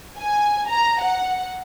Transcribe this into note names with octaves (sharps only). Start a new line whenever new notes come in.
G#5
A#5
F#5